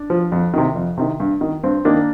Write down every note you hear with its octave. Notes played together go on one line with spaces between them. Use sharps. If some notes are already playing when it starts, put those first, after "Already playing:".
Already playing: D4
F3
F2
C3 D#3
F2
C3 D#3
G2
D#3
G2 C4
D#3 A#3 D4